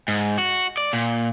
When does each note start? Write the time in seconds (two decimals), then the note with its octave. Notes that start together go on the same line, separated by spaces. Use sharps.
0.08 G#2
0.38 F#4
0.77 D5
0.93 A#2